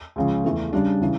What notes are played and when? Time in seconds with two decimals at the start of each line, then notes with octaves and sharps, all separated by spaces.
0.16 C#2 C#3 F3
0.44 E2 E3 A3
0.73 C#3 G3 D4
1.01 C#3 E3